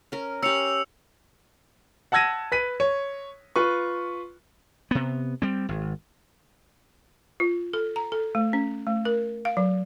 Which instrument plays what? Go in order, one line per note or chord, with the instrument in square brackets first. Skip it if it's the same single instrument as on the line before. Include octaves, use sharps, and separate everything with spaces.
[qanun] C#4 A#4
[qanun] C#4 G4 [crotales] E6 C#7 F7
[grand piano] F#5 A5 E6 G#6 A#6 D#7
B4 B6 D#7
C#5
F4 B4 C#6
[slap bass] C3 B3
G3 C4
G#1
[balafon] F4
A4
A#5
A4
A3
C#4
A3
A#4
F5
F#3